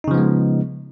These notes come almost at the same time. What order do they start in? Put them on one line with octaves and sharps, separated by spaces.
D#4 C#3 F3 B3 G#3